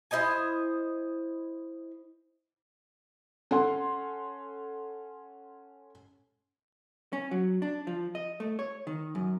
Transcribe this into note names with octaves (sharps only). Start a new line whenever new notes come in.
E4 C5 D#5 G#5
C#4 A4 F#5 C6
C#4
F#3
D4
F3
D#5
A3
C#5
D#3
F#2